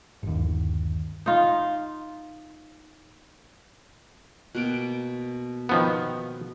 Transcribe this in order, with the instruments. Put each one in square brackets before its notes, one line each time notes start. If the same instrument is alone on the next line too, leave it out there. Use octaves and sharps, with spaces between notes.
[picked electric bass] G1 D#2
[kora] D#4 F4
[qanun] B2 A#3 G5
[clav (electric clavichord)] D#3 F3 B3